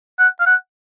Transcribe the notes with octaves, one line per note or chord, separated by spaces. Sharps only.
F#5
F5
F#5